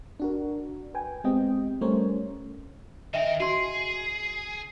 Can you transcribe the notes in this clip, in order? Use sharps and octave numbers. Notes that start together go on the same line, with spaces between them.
D4 F#4 A#4
B4 G5 G#5
G#3 B3 C4 G4 D#5 G5
G3 A3 C#4 A#4 C5 C#5
D#3 A#4 D#5 E5 G5
F#4 G#4 C6